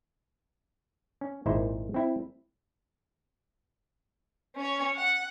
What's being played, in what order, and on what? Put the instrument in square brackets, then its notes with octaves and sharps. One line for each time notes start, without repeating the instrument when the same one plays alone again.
[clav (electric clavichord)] C#4
G#1 A#2 D#4 E4 C5
C4 E4
[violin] C#4 C#5
F#5